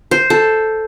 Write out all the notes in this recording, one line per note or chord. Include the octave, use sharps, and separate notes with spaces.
C5
A4